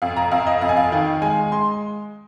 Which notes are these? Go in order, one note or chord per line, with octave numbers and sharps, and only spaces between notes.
F2 F5
A#5
F2 F5
D#5
F2 F5
G#5
F5
D#3
G#3 G#5
G#3 C6